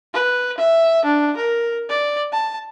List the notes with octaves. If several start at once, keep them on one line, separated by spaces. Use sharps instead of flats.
B4
E5
D4
A#4
D5
A5